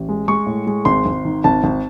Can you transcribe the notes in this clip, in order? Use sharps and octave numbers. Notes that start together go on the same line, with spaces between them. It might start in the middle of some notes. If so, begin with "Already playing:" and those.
Already playing: A1
G#3
G#3 C#6
A2
G#3
G#1 C6
G#1
D#3
G#1 A5
G#1